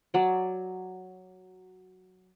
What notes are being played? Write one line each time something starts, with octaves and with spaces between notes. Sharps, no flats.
F#3 D5